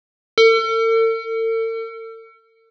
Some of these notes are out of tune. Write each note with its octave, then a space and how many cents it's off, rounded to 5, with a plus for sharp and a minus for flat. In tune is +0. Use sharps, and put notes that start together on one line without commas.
A4 +40